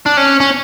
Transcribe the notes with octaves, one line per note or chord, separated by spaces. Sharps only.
D4
C#4
C#4